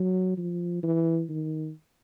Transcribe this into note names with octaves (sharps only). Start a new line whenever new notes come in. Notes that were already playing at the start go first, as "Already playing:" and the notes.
Already playing: F#3
F3
E3
D#3